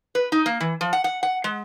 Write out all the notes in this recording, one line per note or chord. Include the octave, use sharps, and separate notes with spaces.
B4
D#4
A#3
E3
F3
F#5
F#5
F#5
G#3